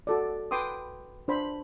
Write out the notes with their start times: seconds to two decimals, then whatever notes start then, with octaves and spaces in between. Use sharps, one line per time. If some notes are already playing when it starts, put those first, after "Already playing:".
0.07 F#4 A4 D5
0.51 B4 G5 C6 D6 D#6
1.28 D4 C5 B5